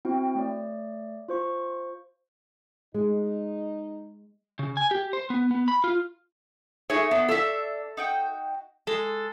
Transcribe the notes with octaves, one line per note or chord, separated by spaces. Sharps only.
C4 E4 F#4 G5
A3 C#5 D5
F4 C5 C#6
G#3 D#4
C#3
G#5
G4
C5
B3
B3
B5
F4
A3 D#4 G#4 C#5
B3 D4
A4 E5
D#4 F#4 G5
G#3 A4